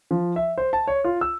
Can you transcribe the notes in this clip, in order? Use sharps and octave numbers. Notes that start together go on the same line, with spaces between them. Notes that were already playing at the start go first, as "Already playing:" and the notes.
F3
E5
C5
A5
C#5
F4
E6